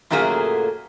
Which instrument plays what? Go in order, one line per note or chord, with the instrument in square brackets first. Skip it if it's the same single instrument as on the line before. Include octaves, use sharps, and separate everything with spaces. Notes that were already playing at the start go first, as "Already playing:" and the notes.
[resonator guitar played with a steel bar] F#2 A#2 F#3 A3 A#3 G#4